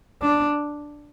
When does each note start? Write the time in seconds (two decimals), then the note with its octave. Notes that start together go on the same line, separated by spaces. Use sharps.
0.22 D4